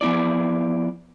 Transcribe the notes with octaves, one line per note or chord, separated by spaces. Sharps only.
F3 B3 E4 D5